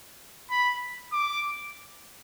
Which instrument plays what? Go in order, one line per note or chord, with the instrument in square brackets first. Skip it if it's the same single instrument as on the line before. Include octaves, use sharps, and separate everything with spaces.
[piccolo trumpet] B5
D6